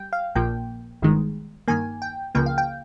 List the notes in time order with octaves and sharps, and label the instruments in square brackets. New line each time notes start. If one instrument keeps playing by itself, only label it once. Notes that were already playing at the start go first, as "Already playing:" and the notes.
Already playing: [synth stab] G3 G5
F5
A#1 A#2 F3 A#3 G5
G1 G2 D#3 G#3
G2 D#3 A#3 G#5
G5
C#2 C#3 F3 A#3 G5
F5
G5